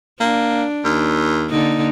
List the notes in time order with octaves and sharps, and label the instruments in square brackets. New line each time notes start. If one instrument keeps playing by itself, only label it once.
[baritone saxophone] A#3 [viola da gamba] D4
[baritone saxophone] D#2
[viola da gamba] D3 A#3 D#4